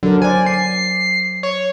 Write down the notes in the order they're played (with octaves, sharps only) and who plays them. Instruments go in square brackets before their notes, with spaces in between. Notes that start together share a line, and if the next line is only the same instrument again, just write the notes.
[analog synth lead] D3 [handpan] F#3 A#4
[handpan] C5 D5 [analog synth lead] G#5
[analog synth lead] C7
C#5